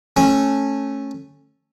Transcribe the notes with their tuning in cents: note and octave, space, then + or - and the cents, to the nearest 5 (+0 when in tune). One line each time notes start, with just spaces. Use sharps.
A3 +0 C#4 -15